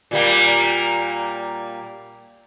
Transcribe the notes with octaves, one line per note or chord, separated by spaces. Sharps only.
A#2 G3 A#3